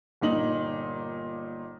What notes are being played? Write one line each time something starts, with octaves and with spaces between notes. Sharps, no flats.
G1 A#2 D#4 F#7